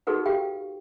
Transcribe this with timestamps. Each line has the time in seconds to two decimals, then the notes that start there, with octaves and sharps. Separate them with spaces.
0.07 D#4 F#4 G#4 A4 B4 F#5
0.26 G4 F5 G5